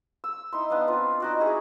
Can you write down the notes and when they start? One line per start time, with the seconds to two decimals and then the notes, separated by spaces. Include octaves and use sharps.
0.24 E6
0.52 D#4 E4 C6
0.70 B3 D4 D#5 F5
0.87 C4 F4 B4
1.20 D#4 F#4 D5
1.40 E4 G#4 C#5